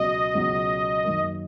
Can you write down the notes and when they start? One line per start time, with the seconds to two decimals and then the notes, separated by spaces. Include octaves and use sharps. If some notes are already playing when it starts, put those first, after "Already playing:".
Already playing: C#2 B2 F#3 C#4 F#4 D#5
0.34 C#2 B2 F#3 C#4 F#4
1.04 F#2 D#3 A#3